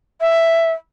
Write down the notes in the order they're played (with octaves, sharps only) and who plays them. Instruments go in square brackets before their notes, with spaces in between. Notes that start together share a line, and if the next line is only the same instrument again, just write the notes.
[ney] E5